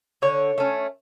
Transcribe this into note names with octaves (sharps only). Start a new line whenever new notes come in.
D3 C#5
A3 C#4